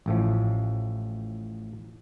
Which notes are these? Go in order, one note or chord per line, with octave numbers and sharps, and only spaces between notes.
A1 A2 F3